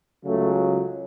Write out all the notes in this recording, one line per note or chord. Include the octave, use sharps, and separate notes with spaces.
C#2 C#3 F#3 A3